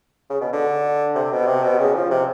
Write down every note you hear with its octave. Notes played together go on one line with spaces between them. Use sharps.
C#3
B2
D3
C3
B2
C3
B2
C#3
F3
C3